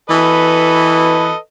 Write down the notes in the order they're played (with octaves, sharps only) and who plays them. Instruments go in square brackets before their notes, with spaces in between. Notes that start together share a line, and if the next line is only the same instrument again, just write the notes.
[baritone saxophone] E3 [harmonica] A4 B4 D#5